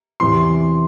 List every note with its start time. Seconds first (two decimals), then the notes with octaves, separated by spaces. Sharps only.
0.20 E2 C3 E3 C6